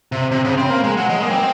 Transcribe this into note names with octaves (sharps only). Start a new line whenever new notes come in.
C3
C3
C#3
C4
A#3
G#3
F#3
G#3
A#3
C4